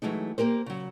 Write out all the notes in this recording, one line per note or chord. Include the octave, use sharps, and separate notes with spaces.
E3 F#3 G#3 A3 D#4
A#3 G4 A#4 C5
C#3 F#3